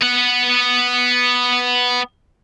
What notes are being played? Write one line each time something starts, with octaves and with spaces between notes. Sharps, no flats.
B3 F#5